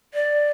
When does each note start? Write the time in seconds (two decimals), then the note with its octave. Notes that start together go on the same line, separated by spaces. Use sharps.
0.14 D5